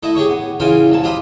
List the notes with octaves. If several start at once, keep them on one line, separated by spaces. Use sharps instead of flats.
A3 E4 D#5
G4 G#4 C#5 C#6
B3
C#3 E3 F4 G5 G#5
C2 A#2 A5
F4 G4 C5 D#5 B5 D#6